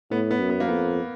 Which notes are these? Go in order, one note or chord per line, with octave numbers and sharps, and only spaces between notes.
A2 B3
B3
F#2
B3
A#3
F2 B3